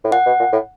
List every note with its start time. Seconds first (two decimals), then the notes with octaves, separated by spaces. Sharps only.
0.04 A2
0.12 A#2 F#5
0.26 B2
0.39 A#2
0.52 A2